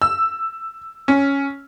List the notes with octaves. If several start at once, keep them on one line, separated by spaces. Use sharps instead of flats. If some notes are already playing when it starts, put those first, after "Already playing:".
E6
C#4